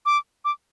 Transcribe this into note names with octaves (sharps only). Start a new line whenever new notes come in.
D6
D6